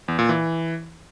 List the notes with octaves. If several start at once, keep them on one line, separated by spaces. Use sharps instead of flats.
E2
A#2
E3